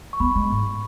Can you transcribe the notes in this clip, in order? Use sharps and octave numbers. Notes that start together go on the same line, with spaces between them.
C#6
B3 B5
G#3
G#2